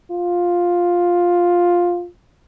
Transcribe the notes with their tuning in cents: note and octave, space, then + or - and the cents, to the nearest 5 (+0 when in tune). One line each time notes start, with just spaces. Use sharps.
F4 +10